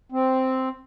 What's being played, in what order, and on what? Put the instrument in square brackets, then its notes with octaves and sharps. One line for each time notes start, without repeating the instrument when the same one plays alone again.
[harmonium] C4